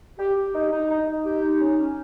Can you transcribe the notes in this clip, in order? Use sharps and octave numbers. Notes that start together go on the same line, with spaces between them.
G4
G4
D#4
D#4
D#4
D#4
G4
D#4
C#4
C#4